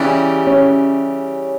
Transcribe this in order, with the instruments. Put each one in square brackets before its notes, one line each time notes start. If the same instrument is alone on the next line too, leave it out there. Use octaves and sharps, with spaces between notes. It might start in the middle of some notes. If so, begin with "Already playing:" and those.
Already playing: [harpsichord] C#3 E3 G3 [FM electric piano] C#4
[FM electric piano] C#4 C#5